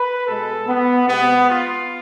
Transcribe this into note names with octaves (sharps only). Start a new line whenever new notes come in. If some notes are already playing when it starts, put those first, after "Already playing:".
Already playing: B4
B2 G#3 A4
B3
C3 G#3 B3
F4